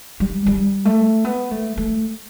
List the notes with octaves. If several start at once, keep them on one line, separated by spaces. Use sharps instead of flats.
G3
G3
A3
B3
A3
A3